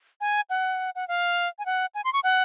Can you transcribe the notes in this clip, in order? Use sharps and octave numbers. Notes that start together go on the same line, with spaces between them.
G#5
F#5
F#5
F5
G#5
F#5
G#5
C6
C#6
F#5